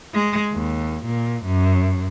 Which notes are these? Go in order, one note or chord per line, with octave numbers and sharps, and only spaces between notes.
G#3
D#2
A#2
F#2